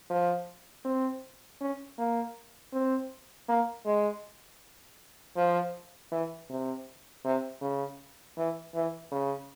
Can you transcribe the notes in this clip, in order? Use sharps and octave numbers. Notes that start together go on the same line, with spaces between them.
F3
C4
C#4
A#3
C4
A#3
G#3
F3
E3
C3
C3
C#3
E3
E3
C#3